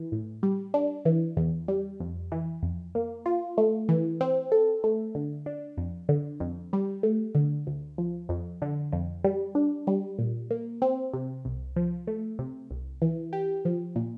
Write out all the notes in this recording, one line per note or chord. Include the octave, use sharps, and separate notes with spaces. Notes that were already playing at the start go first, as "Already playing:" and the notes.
Already playing: E3
A2
G3
D4
E3
E2
G3
F2
E3
F2
A#3
F4
A3
E3
C4
A4
A3
D3
D4
F2
D3
F2
G3
A3
D3
D2
F3
F2
D3
F2
G3
D4
G3
A#2
A#3
C4
C3
C2
F3
A3
C3
C2
E3
G4
F3
A#2